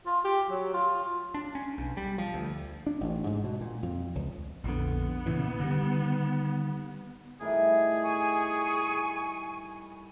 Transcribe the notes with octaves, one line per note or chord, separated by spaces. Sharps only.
F4
G4
F#3
F4
D4
C#4
B1
G3
F3
D2
D4
A1
G#2
B2
A#2
F2
C#2
A#1 F2 D3 B3
A#2 C#3 E3
D3 D#3 G3
A2 D#3 G3 G#4
G#5 C#6